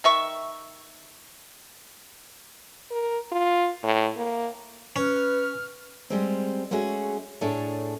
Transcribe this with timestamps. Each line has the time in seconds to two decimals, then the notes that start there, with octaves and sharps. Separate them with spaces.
0.04 D#3 E5 C#6
2.91 A#4
3.32 F4
3.83 A2
4.17 A#3
4.96 C#4 B4 F6
6.10 G3 G#3 C4
6.71 G#3 A3 C#4 F#4 G#4
7.41 A2 A3 D4 G#4 C#5